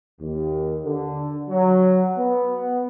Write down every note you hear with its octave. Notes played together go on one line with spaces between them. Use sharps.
D#2
D3
F#3
B3